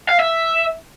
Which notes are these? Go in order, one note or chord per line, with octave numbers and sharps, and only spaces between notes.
F5
E5